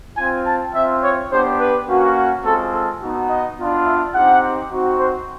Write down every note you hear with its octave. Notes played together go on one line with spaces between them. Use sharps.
C4 F4 G#5
A5
C4 F4 E5
C#5
B3 D4 G4 C5
B4
A#3 C#4 F#4
G#3 C4 F4 A4
A4
B3 D#4 F#4
D#5
B3 D4 F4
E5
C4 D#4 G4 F#5
C4 D#4 F#4
C5